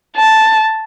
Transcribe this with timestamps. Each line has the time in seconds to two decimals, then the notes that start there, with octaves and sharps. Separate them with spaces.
0.17 A5